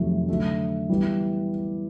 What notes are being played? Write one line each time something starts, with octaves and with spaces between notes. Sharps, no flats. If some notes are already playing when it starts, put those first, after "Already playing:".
Already playing: F2 C3 D#3 F#3 A3
D3 F#3 A3
E3 G3 B3